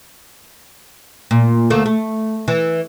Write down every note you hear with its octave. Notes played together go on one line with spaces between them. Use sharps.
A#2
D2 A3 A#3
A3
E3